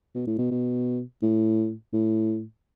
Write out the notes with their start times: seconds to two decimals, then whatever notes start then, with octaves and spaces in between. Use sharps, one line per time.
0.15 B2
0.27 A2
0.38 B2
0.51 B2
1.22 A2
1.93 A2